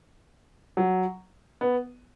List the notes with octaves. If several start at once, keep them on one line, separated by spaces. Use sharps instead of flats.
F#3
B3